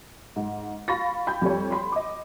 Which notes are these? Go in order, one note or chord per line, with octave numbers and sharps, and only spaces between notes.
G#2
F5 B5 C#6 A6 A#6
G5 B5 G6
F2 G3 C#5
B5 C6
D#5 D6